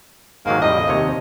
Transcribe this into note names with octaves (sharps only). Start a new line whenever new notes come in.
G#2 D#3 F#3 A#3
F2 A2 G3 D#5
D#2 C3 C#5